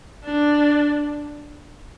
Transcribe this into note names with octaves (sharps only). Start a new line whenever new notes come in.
D4